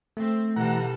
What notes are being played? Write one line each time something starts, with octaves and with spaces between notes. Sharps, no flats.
A3 C4
B2 E3 G3 A4 F#5 A#5